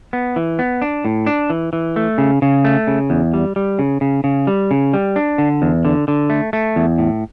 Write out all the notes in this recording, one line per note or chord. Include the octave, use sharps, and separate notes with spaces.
B3
E3
B3
D4
A2
D4
E3
E3
A3
C#3
C#3
A3
C#3
E2
G3
G3
C#3
C#3
C#3
G3
C#3
G3
D4
D3
E2
D3
D3
A3
A3
E2
A2